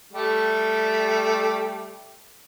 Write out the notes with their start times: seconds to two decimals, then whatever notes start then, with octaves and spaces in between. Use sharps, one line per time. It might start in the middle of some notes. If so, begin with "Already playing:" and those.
0.13 G3 A3 G4